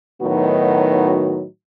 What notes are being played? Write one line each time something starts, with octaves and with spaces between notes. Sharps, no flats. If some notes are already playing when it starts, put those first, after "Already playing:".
A2 D#3 F#3 B3 D#4 F#4